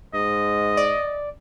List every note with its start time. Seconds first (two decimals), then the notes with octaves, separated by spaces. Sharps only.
0.14 G#2 D#5
0.77 D5